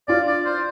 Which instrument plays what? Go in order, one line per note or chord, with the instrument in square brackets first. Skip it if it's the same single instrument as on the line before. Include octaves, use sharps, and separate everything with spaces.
[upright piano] D4 F4 [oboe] D5
[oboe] D5
C5